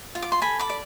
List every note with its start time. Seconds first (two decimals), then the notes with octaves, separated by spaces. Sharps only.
0.15 F4
0.22 D6
0.32 C6
0.42 A4 G#5 B5
0.59 B5 D6
0.70 D5